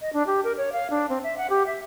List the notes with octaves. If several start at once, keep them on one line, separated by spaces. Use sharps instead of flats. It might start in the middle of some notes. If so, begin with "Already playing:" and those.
D#5
D4
G4
A#4
C#5
F5
D4
C4
E5
F#5
G4
E5